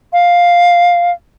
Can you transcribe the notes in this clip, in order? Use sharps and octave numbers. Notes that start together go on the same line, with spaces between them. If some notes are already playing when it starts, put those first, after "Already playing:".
F5